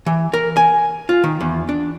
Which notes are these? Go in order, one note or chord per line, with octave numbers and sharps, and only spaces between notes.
E3
A#4
G#5
F4
D#3
E2
D4